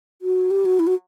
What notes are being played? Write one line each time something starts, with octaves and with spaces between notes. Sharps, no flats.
F#4
G4
F#4
E4
F#4